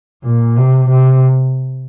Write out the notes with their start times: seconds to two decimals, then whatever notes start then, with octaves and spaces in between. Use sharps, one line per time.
0.23 A#2
0.56 C3
0.89 C3